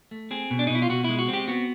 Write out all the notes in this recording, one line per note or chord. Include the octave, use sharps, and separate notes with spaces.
A3
C4 G#4
B2
D4
D#4
B2 E4
F4
B2 F#4
G#3 E4
F#4
C4
G4
B3 F#4